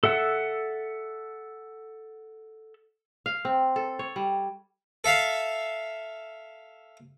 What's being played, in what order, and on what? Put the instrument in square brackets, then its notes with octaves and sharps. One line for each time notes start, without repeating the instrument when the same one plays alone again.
[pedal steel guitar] A4 E5 F#5 E6
[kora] F5
C4
A4
C#5
G3
[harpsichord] A4 E5 F5